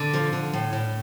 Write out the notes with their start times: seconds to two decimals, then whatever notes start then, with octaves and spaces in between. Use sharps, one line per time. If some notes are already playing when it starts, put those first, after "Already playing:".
Already playing: D3
0.14 F3
0.33 D3
0.53 A2
0.73 A2